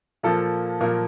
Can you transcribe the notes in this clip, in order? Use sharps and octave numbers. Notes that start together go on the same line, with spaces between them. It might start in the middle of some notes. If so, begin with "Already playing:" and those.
A#2 F3 A#3 A4
A#2 F3 A#3 A#4